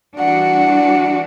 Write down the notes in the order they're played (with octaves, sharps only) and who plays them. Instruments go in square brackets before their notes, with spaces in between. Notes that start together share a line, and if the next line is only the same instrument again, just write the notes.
[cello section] E3 G3 D4 F#4 [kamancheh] F#5